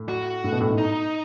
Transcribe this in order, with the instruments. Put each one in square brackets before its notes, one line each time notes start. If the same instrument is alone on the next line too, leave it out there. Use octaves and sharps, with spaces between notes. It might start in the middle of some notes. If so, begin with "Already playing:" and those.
Already playing: [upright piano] A2
[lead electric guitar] F#4
[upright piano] A2
B2
A2
G#2
[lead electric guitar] D#4